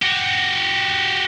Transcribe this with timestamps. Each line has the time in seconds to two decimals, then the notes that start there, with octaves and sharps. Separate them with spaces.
0.02 F#4 G4